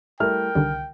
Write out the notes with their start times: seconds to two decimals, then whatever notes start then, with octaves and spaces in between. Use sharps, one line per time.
0.20 G3 A3 E4 A#4 G5 F6
0.55 C2 D3 D#3 G3